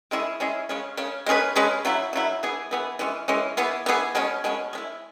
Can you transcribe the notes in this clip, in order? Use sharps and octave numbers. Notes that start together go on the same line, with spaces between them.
G#3 C#4 E4 G#4
G#3 C#4 E4 G#4
C#3 G#3 C#4
C#3 G#3 C#4
G#3 C#4 G#4 B4
G#3 C#4 G#4 B4
C#3 F#3 E4
C#3 F#3 E4
E3 B3 G#4
E3 B3 G#4
E3 G#3 C#4
E3 G#3 C#4
E3 B3 G#4
E3 B3 G#4
B2 G#3 C#4
B2 G#3 C#4
G#3 C#4 E4